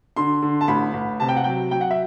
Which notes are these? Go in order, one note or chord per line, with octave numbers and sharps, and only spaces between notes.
D3 C6
D3
A5
A1 B5
A1
C3 A5
G5
F#5
F#3 G5
F#3 G5
F#5
E5